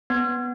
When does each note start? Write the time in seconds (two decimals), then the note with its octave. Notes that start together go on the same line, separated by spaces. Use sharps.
0.10 B3